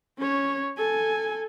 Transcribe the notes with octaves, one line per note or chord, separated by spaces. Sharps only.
C#4 C#5
A4 G#5